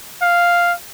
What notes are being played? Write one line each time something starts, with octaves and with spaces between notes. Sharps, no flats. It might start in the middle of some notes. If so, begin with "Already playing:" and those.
F5